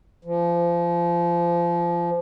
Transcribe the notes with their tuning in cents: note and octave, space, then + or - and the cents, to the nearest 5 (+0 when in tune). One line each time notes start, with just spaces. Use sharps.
F3 -25